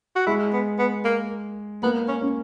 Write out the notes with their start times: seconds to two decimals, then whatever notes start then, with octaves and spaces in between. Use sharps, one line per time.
0.16 F#4
0.26 G#3 E4
0.53 B3
0.79 B3
1.04 A#3
1.83 A#3 B3
2.08 C#4
2.21 C#4